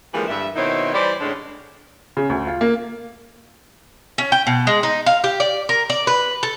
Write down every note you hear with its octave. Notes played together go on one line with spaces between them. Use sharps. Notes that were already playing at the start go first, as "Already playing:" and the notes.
D3 E3 F3 G3 G#3 A#3
G2 D3 E5
B2 D#3 C4 D#4 E4 C#5
E3 G3 G4 C5 D5
A2 D3 G#3 C#4 D4
C#3
D2
F4
A#3
C#4
G5
B2
G#3
D#4
F5
G4
D5
A#4
D5
B4
A4